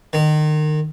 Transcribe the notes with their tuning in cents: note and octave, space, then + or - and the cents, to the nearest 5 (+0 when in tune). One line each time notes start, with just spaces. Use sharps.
D#3 -30